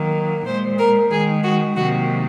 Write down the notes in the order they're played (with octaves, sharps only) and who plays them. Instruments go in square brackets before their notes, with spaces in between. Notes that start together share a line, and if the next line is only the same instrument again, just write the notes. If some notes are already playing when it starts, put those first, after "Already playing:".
Already playing: [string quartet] D#3 F#3 A#3
A#2 G#3 C5
A#4
D#3 G#3 G#4
F#4
C3 D#3 F#3 A#3 F#4